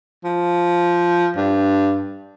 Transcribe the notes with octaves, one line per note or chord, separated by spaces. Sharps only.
F3
G2